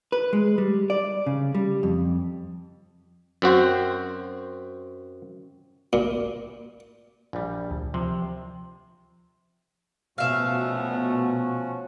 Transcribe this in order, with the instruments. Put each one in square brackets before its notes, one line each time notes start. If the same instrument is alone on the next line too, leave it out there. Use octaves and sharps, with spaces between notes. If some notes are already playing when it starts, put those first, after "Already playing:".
[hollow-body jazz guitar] B4
G#3
G3
D5
C#3
G3
F2
[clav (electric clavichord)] F#2 C4 F#4 C5
[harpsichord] A#2
[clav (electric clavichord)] A#1 G3
[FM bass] D2
[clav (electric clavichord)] C3 [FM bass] F3
[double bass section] B2 [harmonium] F3 C#4 F#4 [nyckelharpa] A3 B3 [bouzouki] E5 F5